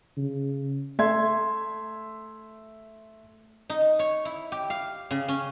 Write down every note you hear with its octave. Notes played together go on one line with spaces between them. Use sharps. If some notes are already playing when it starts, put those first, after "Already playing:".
C#3
A3 E5 C6 G#6
D#4
C#5
E4
G4
F5
C#3
C#4